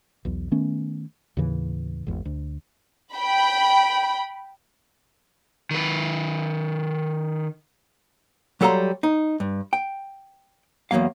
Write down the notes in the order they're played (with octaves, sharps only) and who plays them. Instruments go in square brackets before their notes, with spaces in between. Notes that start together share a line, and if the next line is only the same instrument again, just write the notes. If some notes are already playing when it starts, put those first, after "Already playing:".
[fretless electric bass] B1 E2
D#3 A3 B3 C#4
D#2 A2 C#3 E3
G#1 E2
D2
[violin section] G5 B5
[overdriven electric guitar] D#3 B4
[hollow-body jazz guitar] F#3 G3 A4 F5 A#5 C6
D#4
G2
G5
E2 G#2 F#3 A#3 F5